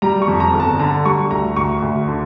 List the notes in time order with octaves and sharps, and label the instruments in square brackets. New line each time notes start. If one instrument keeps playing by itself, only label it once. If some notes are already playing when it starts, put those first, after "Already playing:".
[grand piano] G3 A#5
C#6
F2
A#5
G1
A5
D3 A#5
G3 C#6
D2 A#5
D2 C#6
D2
D3